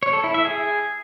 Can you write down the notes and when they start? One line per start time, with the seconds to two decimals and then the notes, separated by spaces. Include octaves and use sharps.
0.03 C#5
0.13 A4
0.24 E4
0.34 E5
0.45 G#4